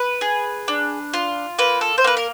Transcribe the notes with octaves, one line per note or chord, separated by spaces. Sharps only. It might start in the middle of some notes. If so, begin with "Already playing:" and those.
Already playing: B4
G#4
D4
F4
A#3 B4
A4
C5
A#3 B4
A#4